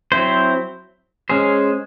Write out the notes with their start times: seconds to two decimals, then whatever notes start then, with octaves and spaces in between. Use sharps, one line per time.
0.12 F#3 C4 E4 C5
1.29 G#3 C#4 G#4 C5